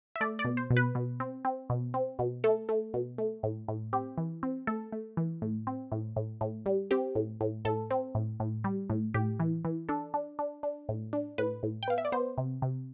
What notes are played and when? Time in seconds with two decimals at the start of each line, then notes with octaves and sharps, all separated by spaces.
0.16 E5
0.21 A3 D5
0.39 D5
0.45 B2
0.57 C5
0.70 B2
0.77 B4
0.95 B2
1.20 C4
1.45 C4
1.70 B2
1.94 C4
2.19 B2
2.44 A3 A4
2.69 A3
2.94 B2
3.18 A3
3.43 A2
3.68 A2
3.93 C4 G4
4.18 E3
4.43 C4
4.67 A3 A4
4.92 A3
5.17 E3
5.42 A2
5.67 C4
5.92 A2
6.16 A2
6.41 A2
6.66 G3
6.91 C4 G4
7.15 A2
7.41 A2
7.65 A2 A4
7.91 C4
8.15 A2
8.40 A2
8.64 G3
8.90 A2
9.14 A2 G4
9.40 E3
9.65 E3
9.89 D4 A4
10.14 D4
10.39 D4
10.63 D4
10.89 A2
11.13 D4
11.38 A2 B4
11.63 A2
11.83 G5
11.88 B3 F5
11.98 E5
12.05 D5
12.12 B3 C5
12.38 C3
12.62 C3